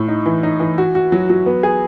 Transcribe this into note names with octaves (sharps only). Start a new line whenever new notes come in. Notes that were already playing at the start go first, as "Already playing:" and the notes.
Already playing: A2
D#4
E3
D#4
E3
F#4
F#4
F#3
F#3
B3
G#4